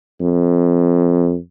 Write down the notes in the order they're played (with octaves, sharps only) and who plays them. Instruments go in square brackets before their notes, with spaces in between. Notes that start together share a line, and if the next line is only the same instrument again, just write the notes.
[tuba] F2